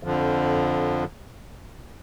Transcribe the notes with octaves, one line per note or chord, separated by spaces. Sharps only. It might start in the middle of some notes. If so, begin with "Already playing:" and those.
F2 D3 F3